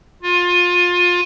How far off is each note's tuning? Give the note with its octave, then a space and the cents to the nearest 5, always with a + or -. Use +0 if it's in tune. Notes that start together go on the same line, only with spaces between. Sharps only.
F4 +25